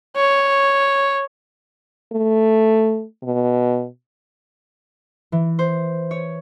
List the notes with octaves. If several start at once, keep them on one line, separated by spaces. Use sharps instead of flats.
C#5
A3
B2
E3
C5
C#5